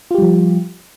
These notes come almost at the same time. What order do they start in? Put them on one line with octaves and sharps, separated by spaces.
F4 G4 G3 F3